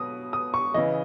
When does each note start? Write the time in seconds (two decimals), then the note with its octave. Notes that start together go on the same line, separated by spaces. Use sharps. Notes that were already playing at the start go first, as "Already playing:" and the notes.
Already playing: B2 F#3 D#6
0.33 D#6
0.54 C#6
0.74 C#3 E3 D#5